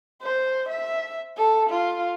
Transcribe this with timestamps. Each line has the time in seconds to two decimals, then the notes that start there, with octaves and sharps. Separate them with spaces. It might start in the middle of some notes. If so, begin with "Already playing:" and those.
0.22 C5
0.69 E5
1.37 A4
1.70 F4